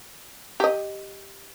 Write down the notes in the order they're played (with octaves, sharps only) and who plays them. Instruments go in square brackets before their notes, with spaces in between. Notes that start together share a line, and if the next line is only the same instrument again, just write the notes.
[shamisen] G4 D#5